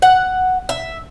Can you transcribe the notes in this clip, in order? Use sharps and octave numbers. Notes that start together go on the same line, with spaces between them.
F#5
E5